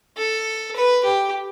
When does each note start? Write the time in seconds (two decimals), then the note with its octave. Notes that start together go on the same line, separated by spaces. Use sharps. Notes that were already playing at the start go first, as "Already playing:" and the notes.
0.17 A4
0.76 B4
1.04 G4